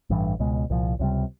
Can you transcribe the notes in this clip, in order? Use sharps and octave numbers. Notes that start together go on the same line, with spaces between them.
A1 G2 E3
C#2 B2 G#3
C2 A#2 F3
C#2 C3 E3 G3